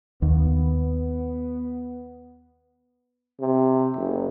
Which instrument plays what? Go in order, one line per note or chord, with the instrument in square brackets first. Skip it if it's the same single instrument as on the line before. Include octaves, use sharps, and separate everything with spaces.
[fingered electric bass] D#2 [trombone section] B3
[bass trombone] C3
F#1